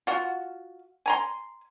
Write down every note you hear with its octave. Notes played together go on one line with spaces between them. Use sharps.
F4 F#4
G#5 A#5 C6